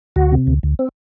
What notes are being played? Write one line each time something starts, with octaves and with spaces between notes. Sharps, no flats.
D2 F#4
C3
D2
D2
C4